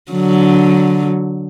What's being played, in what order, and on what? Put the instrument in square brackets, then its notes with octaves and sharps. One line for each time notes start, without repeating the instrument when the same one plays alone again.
[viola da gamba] D3 F#3